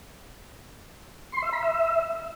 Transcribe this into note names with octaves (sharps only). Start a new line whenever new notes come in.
C6
E5
B5
E5